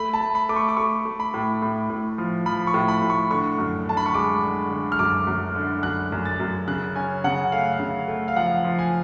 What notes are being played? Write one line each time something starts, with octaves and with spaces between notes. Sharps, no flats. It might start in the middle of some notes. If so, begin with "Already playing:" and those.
Already playing: A3 B5
A5
A3
B5
A3 D6
C#6
D6
A3 C#6
A3
B5
A2
A2
A2
F3
F3 B5
C#6
A2
B5
A2
C#6
D3 C#6
F#2
D3 A5
B5
C#6
G#3 D6
D3
D3
F6
F#2 D6
F#2
D3
F#2 F#6
F#2
A6
F#2
C#3 F#6
C#4 G#5
C#3 F#5
A3 F5
F5
C#3
A3
F5
F3 F#5
F3
G#5